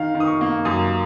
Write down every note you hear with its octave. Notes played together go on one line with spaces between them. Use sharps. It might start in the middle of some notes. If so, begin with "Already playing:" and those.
Already playing: D#3 F5
D#3
D#6
C#6
A#3
F#2 D#6